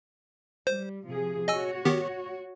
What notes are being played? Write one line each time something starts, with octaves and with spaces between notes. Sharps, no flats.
G3 C5
C3 F3 G#4
F#4 C#5 D#5 G#5 E6
D#3 B3 G4